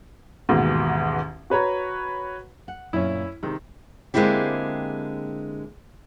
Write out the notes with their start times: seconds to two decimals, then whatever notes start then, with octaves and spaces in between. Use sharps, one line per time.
0.49 A1 D#2 G#2 B2
1.50 F#4 B4 C#5 A#5
2.68 F#5
2.93 F#2 A#2 C#4 E4
3.43 C3 D#3 G#3
4.14 D3 G#3 A#3 C4 E4 G4